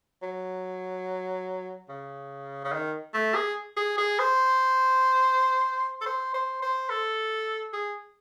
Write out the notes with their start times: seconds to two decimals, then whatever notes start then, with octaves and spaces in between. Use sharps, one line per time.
0.22 F#3
1.89 C#3
2.64 C#3
2.73 D#3
3.14 A3
3.35 G#4
3.77 G#4
3.98 G#4
4.19 C5
6.01 A4
6.06 C5
6.34 C5
6.62 C5
6.90 A4
7.73 G#4